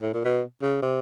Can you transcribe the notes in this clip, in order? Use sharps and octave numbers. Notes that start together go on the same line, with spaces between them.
A2
A#2
B2
C#3
C3